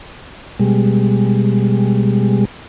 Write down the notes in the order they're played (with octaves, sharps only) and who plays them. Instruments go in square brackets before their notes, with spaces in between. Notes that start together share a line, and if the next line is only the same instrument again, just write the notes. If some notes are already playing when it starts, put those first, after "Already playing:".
[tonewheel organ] B2 G3 G#3